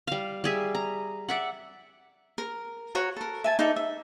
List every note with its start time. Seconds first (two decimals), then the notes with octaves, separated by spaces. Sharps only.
0.07 G3 F5
0.44 G3 G#4 E5
0.75 A#5
1.29 D5 E5 F#5
2.38 A#4
2.95 F#4 C#5 A#5
3.16 A4 A#4
3.44 E5 G#5 A5
3.59 D#4 A4 D5 E5
3.76 E5